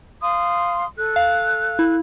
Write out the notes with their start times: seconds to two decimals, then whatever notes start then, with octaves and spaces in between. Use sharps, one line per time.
0.22 F5 C6 D#6
0.97 A4 F#6
1.16 F5
1.79 E4